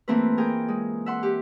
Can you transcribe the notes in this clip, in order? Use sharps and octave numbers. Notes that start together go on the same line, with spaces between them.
E3 A3 A#3 C4 F4 B4
G#4 A#4 G5
G#3
E5 F#5 C6
G4